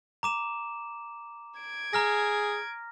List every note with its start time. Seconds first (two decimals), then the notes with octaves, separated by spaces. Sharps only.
0.23 A#5 D6 E7
1.60 G#6 D7
1.93 G#4 A#5 F6 A#6